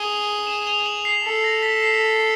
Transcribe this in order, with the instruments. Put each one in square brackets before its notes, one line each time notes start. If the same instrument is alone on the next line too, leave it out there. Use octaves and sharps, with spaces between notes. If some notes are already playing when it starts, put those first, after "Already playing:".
Already playing: [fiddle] G#4 [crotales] F7 G7
[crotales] E7 F#7
F7 G7
E7 F#7
C7
[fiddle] A4 [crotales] B6
[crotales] A#6
B6
C7